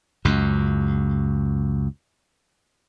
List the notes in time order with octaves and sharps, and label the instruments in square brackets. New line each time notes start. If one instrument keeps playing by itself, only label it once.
[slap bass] C#2 F#2